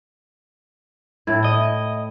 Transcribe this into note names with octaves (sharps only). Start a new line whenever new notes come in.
A2 E4
D#5